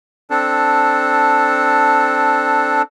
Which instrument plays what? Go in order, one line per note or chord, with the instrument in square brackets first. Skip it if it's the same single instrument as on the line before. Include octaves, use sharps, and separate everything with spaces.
[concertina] C4 D4 A4